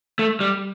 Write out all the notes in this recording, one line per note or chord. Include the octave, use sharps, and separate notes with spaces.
A3
G3